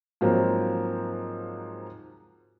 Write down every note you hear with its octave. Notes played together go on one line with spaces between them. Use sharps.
G#2 F3 F#3 A#3 C4